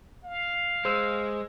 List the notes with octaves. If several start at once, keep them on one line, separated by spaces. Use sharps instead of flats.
F5
G#3 C5 E6